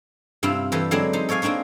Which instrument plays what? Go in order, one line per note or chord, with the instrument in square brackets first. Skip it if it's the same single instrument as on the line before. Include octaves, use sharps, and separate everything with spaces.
[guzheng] G2 C3 C4 E4 F4
E3 G3 A4 B4 C5
D3 F#3 G#3 C4 D4 E4
D#4 C5
A4 C#5 D5 F5 G#5
A#3 C4 D4 D#4 C#5